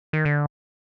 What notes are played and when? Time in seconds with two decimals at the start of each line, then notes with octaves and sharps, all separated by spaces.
0.13 D#3
0.25 D3